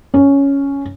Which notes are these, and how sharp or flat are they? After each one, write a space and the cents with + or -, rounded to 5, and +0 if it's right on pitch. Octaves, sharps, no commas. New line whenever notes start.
C#4 +5